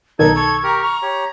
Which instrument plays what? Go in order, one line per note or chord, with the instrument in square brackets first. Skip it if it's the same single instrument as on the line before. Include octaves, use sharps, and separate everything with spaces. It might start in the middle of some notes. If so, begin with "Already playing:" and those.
[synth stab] B1 D#3 [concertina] D#4 A4 [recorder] G#6
[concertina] A4 [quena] C#6 [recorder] G#6
[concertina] G4 A#4 [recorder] A#5
[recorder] A#5 [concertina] F6
[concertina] G4 C#5